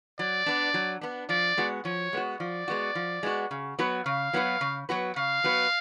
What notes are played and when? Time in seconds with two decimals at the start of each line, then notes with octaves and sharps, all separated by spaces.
0.19 F#3 D5
0.46 B3 D4
0.74 F#3
1.01 B3 D4
1.29 F3 D5
1.57 G#3 B3 F#4
1.85 F3 C#5
2.13 G#3 B3 F#4
2.40 F3 D5
2.68 G#3 B3 F#4
2.95 F3
3.23 G#3 B3 F#4
3.51 C#3
3.79 F#3 B3 F#4 B4
4.06 C#3 F5
4.33 F#3 B3 F#4 B4
4.61 C#3
4.89 F#3 B3 F#4 B4
5.16 C#3 F5
5.44 F#3 B3 F#4 B4